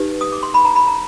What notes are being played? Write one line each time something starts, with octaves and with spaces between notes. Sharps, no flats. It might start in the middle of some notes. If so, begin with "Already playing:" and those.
Already playing: D#4 G4 B4
D#6
D6
C6
B5
A#5
B5
A#5